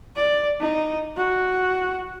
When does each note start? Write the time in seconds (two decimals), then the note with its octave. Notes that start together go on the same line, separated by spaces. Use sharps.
0.16 D5
0.61 D#4
1.16 F#4